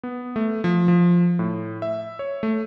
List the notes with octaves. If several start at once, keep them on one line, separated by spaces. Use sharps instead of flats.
B3
A3
F3
F3
A2
E5
C#5
A3